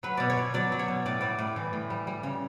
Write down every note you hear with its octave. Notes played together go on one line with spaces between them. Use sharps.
F#3 B4
B2 D5
C#5
B2
F#3 D5
F#3
C#5
B2
A2 D5
G3 D5
A2
E3
A2
G3
G3
C#3